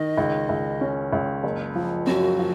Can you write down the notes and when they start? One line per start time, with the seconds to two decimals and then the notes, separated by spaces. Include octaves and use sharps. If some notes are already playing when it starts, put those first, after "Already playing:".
Already playing: D#3 D#5
0.18 C#2
0.49 C#2
0.81 C#4
1.13 C#2
1.44 F#1
1.75 F3
2.07 F#2 F#4
2.39 F3